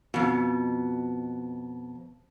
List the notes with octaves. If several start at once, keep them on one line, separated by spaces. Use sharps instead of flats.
F2 B2